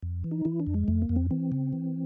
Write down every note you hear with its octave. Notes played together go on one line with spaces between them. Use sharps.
F2
E3
D#4
E3 E4
D4
F2
G#3
F2 A3
A#3
F2
C4
E3 C4
C#3
E3